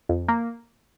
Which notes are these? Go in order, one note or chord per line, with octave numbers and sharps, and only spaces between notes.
F2
A#3